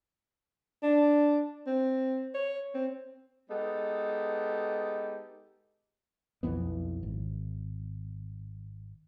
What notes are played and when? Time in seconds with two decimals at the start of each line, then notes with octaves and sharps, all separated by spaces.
0.82 D4
1.67 C4
2.34 C#5
2.74 C4
3.50 G#3 B3 D#4 G4 A4
6.43 B1 F2 E3 B3
7.03 G#1